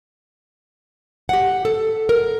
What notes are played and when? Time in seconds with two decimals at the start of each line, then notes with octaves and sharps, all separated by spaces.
1.29 G4 F#5
1.65 A4
2.09 A#4